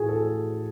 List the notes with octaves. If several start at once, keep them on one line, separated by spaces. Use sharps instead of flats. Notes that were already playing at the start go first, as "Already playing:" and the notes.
Already playing: A2 E3 F#4 G#4
A4